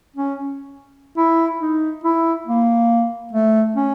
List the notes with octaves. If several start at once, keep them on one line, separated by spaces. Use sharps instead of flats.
C#4
E4
D#4
E4
A#3
A3
C#4